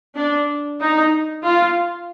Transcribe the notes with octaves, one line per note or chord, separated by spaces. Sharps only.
D4
D#4
F4